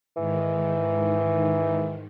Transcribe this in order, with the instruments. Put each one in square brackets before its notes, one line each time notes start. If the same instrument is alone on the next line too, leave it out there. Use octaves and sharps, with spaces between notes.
[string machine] G#2 D#3 [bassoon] E3